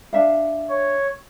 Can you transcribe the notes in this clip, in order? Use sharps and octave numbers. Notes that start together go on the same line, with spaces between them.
D4 E5 F5
C#5